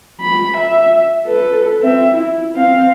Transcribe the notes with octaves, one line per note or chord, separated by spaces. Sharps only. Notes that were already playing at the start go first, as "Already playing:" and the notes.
B5
E5
A4 B4
C4 E5
E4
C4 F5